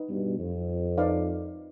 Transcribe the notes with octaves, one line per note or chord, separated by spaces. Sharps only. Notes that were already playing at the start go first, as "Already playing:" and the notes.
Already playing: D#4 B4 D#5
G2 B2
F2
D#4 B4 D5 F5